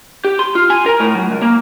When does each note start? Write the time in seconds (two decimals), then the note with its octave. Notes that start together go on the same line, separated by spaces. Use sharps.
0.25 G4
0.39 C6
0.55 F4
0.70 G#5
0.86 A#4
1.00 A2
1.15 F#3
1.31 C#2
1.42 A#3